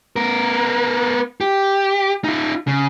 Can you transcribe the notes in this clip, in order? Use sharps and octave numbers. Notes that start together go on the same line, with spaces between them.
B3 A#4
G4
D#4 F4
C#3